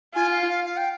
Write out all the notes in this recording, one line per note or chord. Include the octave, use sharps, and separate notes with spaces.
F4 G#5
F5
F5
F5
G5